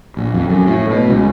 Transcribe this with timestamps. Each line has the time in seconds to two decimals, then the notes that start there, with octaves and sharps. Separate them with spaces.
0.17 A#1
0.34 F2
0.49 F#2
0.67 A2
0.90 B2
1.08 C#2